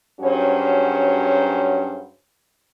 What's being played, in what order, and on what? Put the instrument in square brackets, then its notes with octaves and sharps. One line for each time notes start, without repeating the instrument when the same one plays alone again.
[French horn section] G2 F#3 C#4 F#4 G#4 C5